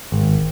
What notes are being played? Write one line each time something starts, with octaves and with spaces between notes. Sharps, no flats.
G#1